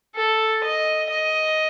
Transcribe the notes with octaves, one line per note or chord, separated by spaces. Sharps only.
A4
D#5
D#5